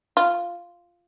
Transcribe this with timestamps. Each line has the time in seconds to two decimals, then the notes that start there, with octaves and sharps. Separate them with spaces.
0.17 F4